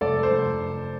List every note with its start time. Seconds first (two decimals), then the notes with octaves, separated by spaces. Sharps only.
0.01 F1 A4 D5
0.23 C5
0.31 F1